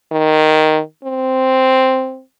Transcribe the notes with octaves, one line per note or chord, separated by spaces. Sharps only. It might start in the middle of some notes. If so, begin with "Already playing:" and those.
D#3
C4